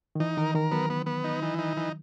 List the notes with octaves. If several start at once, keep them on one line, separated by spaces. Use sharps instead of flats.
D#3
E3 D#4
D#3 A#4
D#3 A#4
F#3 B3
B3
B3
D#4
E3
D#4
E3